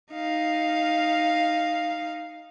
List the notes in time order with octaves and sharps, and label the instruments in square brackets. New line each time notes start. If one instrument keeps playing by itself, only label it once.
[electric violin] D#4 F5